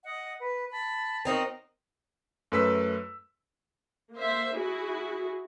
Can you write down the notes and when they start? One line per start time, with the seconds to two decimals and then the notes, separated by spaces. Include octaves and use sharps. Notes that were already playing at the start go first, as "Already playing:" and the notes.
0.03 D#5 F#5
0.39 B4
0.71 A5 B5
1.25 C4 D#4 F#4 A#4 D#6
2.52 F#2 A3 B4 E6 B6
4.15 A#3 C5 E5
4.55 E4 F#4 G#4